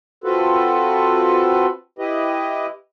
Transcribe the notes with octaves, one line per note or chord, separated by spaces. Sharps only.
C4 F4 F#4 A4 B4
E4 G4 B4 D#5